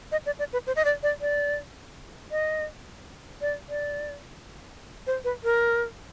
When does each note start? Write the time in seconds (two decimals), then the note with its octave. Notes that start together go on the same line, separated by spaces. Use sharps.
0.12 D#5
0.26 D5
0.39 D5
0.53 B4
0.67 C5
0.76 D#5
0.85 D5
1.03 D5
1.21 D5
2.31 D#5
3.41 D5
3.69 D5
5.07 C5
5.24 B4
5.44 A#4